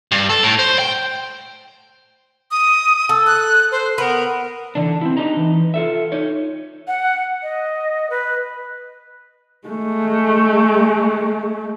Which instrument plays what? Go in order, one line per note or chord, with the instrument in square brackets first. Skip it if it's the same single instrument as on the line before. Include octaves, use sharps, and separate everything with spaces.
[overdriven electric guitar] G2
A4
A2
C5
G5
[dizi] D#6
[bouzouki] A4
[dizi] F#6
C5
[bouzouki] B3 [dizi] A#4
[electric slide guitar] D3 E3 D4
C4 E4
D4 D#4 G4 D#5 A#5
E3
F4 A4 E5
D#4 C#5
[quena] F#5
D#5
B4
[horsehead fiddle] G#3 A3